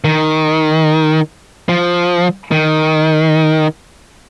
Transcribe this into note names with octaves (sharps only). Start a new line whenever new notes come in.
D#3
F3
D#3